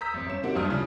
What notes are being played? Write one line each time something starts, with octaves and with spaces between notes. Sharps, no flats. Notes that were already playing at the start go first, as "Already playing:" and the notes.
A#5 D#6 E6 G6 B6
A1 C4
G1 C#4 E7
D#3 A#3 C4 F#4 G4
G#1 D2 G2 D4 D#6 F6
G2 C#3 F3 G3